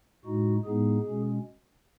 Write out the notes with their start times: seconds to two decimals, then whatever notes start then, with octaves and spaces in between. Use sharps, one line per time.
0.25 A2 G#3 D#4 F#4
0.66 A2 G#3 B3 D#4 G#4
1.06 B2 G#3 C#4